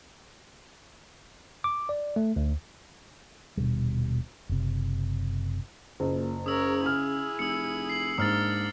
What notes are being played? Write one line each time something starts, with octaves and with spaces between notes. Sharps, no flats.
D6
D5
A3
D2
D#1 B2 D3 G3
F#1 C3
F#1 A#2
C#3 A#4 C#5 D#6 E6
E4 G#4 F6
F1 E6 C#7
C7 F#7
G#2 A#3 D4 D#6 F6 A6